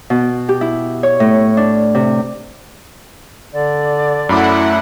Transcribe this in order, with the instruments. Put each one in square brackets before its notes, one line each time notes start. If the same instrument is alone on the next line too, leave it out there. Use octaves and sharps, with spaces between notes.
[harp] B2
G4
E4
C#5
A2
D4
C3
[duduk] D3 [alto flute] D5
[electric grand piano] F#2 B5 D6 [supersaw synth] A3 E4 F#5